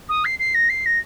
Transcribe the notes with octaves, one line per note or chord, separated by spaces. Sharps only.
D#6
C7
C7
A#6
C7
A#6